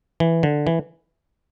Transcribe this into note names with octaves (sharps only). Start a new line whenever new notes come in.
E3
D3
E3